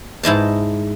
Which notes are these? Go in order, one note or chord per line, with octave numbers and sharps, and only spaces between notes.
G#2 E4 D#5 A5